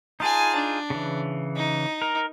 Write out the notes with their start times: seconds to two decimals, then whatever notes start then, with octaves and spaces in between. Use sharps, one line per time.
0.20 D#4 F4 G#4 G#5 A5
0.56 D4
0.90 C#3 E3
1.56 D#4
2.02 A#4